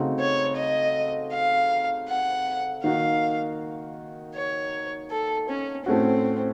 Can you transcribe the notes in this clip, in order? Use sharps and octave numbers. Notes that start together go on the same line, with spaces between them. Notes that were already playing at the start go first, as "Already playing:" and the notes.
Already playing: C#3 A3 C4 D#4 F#4
C#5
D#5
F5
F#5
D#3 A#3 D#4 F#4 F5
C#5
A4
C#4
A2 A3 C4 C#4 F#4